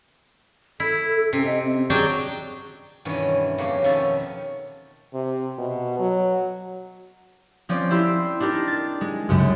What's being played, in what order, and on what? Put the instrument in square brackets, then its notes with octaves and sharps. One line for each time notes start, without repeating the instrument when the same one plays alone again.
[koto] E4 [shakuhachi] A4
[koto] C3 [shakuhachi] C#4
[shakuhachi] D#5
C4
[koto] F#3 D4 G5 [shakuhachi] G#4
[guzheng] G2 B2 D#3 E3 C#4
F2 C#3 A#3 G4 C#5
F2 B2 D#3 C#4 E5 A5
[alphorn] C3
B2
F#3
[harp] F3 C4 C#4 D5 G6
E4 G4 C6 E6
D4 D#4 G4 A#4
A6
G#3
C2 F#2 C#3